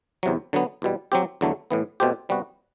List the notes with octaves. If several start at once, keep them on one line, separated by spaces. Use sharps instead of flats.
E2 C3 F#3
D3 F#3 B3
E2 B2 G3
F#3 C4 G4
E2 D3 F#3 A3
A2 E3 B3
B2 A3 C4 G4 C5
C3 G3 B3 F#4